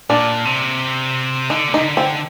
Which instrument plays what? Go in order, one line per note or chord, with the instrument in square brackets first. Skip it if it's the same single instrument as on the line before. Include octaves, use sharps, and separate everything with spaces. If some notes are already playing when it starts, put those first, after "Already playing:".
[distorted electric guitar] A#2 [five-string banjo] D4
[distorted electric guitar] C3
[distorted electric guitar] D3 [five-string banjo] D#4
[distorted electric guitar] A#2
[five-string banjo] D#4
[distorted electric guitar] C3
D3
[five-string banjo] C4